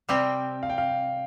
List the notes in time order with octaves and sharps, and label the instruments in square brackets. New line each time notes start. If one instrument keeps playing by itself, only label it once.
[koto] C3 G3 C4 G4 [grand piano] G5
[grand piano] F5
G5
F5